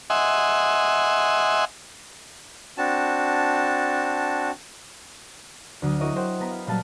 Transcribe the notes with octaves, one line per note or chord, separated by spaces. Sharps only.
D#5 E5 F#5 G#5 C6
C4 D4 F#4 A5
D2 F#3 D#6
E4 F#4 A#4 C#5 D#5
A#4 C5 F#5 G5
B3 A#5 B5
F5
A#2 F#3 G3 B4 F5 A5